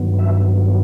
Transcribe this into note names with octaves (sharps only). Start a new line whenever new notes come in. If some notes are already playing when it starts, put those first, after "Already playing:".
Already playing: G2 D#3 F#3 B3
E5